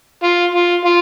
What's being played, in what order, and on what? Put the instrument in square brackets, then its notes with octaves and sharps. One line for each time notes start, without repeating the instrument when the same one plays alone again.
[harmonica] F4
F4
F4